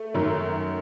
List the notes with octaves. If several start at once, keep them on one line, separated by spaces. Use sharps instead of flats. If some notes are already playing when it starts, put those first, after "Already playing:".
Already playing: A3
F#2 D#3 F#3